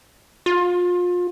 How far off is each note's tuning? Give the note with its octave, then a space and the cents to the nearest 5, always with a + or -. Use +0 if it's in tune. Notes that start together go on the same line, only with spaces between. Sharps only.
F4 +30